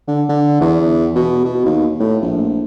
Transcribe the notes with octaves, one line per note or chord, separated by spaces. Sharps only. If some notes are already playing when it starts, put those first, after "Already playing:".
D3
D3
E2
B2
B2
D#2
A2
A#1